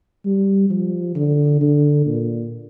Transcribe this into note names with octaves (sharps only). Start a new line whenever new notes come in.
G3
F3
D3
D3
A#2